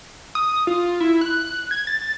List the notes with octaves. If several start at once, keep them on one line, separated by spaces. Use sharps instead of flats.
D#6
F4
E4
F#6
G#6
A6